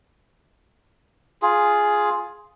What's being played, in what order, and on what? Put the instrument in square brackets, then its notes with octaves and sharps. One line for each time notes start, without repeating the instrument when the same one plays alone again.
[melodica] F4 G#4